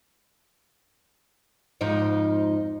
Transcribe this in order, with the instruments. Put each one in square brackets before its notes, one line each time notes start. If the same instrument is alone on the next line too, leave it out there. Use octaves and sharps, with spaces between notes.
[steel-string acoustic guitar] F2 G#2 F3 D#4